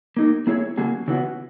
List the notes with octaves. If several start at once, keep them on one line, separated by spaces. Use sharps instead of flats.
A#3 D#4 A#4
A#3 E4 G#4 C#5
C#3 F#3 A#3 C#4 G#4
C#3 E3 B3 F#4